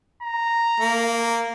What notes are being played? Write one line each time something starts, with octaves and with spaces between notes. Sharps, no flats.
A#5
A#3